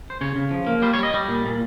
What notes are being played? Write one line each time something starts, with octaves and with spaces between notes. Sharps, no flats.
C5
C#3 C#5
C#3
F3
A#3
G3 C5
C#5
G3 D#5
G3
A#2
A#2